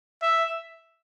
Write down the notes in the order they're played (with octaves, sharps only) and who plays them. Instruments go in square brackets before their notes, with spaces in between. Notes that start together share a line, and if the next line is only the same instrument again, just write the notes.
[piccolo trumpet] E5